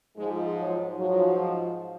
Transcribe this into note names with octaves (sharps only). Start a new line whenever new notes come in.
G#2 F3 G#3
F#3
G#2 F3 F#3